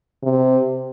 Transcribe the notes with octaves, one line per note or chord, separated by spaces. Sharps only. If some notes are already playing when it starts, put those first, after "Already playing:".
C3